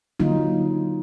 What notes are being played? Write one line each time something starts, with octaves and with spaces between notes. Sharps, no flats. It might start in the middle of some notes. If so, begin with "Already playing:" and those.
D3 F#3 A#3 D#4 F4